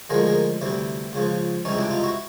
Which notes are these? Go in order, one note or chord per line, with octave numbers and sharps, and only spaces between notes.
D2 D3 F3 G#3 G#4 A#4
G#4 A#4
D2 C3 E3 G3
C#2 C#3 F3
C#2 C3 E3 G3 C#4 D#4
D4 E4
D#4 F4
E4 F#4